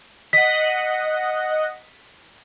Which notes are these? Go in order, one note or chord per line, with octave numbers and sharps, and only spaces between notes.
D#5 F#5 B6